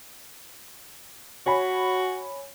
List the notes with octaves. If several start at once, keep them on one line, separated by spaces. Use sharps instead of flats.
F#4 C#5 G#5 B5